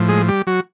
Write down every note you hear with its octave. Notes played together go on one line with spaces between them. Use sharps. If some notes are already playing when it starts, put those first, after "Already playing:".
Already playing: A2 F3
G#3 G#4
G3 G4
F#3 F#4